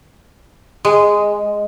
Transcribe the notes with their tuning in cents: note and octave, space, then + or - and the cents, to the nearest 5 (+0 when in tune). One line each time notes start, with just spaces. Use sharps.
G#3 -5